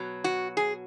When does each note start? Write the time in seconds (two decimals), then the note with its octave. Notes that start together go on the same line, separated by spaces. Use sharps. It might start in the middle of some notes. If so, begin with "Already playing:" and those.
Already playing: B2 F#3
0.24 F#4
0.57 G#4